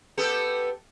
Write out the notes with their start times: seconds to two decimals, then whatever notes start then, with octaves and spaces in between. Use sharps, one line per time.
0.17 B3 G4 A4